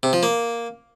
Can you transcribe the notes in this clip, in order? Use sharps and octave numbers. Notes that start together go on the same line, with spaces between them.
C3
F3
A#3